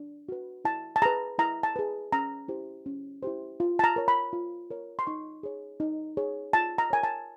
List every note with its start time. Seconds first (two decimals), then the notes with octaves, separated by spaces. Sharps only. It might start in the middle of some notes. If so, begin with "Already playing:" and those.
Already playing: D4
0.29 F#4 B4
0.65 E4 A5
0.96 A5
1.02 G#4 B4 A#5
1.39 E4 A#5
1.63 A5
1.76 G#4 B4
2.13 C#4 A#5
2.48 E4 G4 C5
2.86 C#4
3.23 E4 G4 C5
3.60 F4
3.79 A5
3.84 A#5
3.96 A#4 C#5
4.08 B5
4.33 F4
4.70 A#4 C#5
4.99 C6
5.07 D#4 C#6
5.43 G#4 C#5
5.80 D#4
6.17 G#4 C#5
6.53 F4 A5
6.78 A#5
6.90 A#4 C#5 G#5
7.03 A5